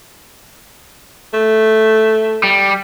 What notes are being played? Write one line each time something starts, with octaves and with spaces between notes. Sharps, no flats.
A3
G3